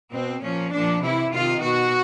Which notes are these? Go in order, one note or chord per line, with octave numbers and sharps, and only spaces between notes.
B2 C4
A#2 F3 C#4
A#2 F3 D4
C3 E3 E4
C3 D#3 F4
B2 F#4